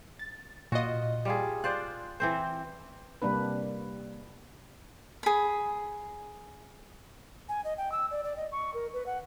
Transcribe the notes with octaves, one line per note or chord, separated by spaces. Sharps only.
A6
A#2 F4 F#4 D#5
G3 F4 G#4
F4 C5 D5 F#6
E3 C4 C5
C3 G3 A#3 D4 B4
G#4 B5
G#5
D#5
G5
E6
D5
D5
D#5
C#6
A#4
B4
F#5